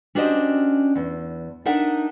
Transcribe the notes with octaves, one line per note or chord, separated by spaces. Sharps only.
C#4 D4 F#4 G4 C5 D#5
E2
D4 D#4 A#4 E5 F#5